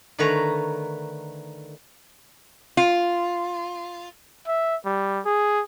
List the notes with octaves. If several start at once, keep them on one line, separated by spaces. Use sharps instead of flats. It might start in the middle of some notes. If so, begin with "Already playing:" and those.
D3 D#3 A3 B4 C#5 A#5
F4
E5
G3
G#4